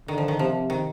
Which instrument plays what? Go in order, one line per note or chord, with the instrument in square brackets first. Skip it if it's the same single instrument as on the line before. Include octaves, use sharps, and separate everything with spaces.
[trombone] D3 [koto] D#3
[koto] F3
D#3
[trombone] C3 [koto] F3
[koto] D#3